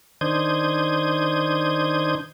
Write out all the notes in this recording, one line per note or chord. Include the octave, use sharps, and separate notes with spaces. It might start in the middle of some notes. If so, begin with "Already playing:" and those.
D#3 D4 C5 D#6 G6 G#6